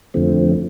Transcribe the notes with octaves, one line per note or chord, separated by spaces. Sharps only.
F2 D3 F3 A3 C4